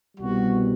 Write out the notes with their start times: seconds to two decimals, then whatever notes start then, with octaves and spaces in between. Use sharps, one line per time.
0.16 C2 B2 G3 F#4